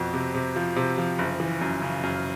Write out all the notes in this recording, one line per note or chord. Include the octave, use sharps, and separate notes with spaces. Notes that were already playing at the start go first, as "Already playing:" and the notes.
Already playing: F2 B2
C3
C3
F3
C3
F3
F#1
E3
F#2
C#3
F#2